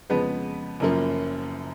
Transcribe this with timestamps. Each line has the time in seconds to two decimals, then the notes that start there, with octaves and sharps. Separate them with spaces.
0.09 F2 C#3 F3 G#3 B3 B4
0.80 F#1 F#2 F3 A#3